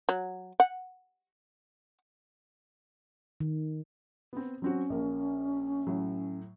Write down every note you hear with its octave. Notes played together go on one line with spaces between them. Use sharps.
F#3
F#5
D#3
B3 C4
F#3 C4 C#4 F#4
A#1 A#3
A2 F#3